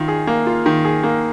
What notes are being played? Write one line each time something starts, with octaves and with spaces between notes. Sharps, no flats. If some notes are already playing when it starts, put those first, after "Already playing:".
Already playing: D#3 F4
G#4
A#3
F4
D#3
G#4
A#3